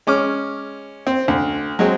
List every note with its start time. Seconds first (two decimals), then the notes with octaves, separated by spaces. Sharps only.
0.07 G#3 C#4 D6 F6
1.07 C4
1.28 D2
1.79 F#3 G#3 C4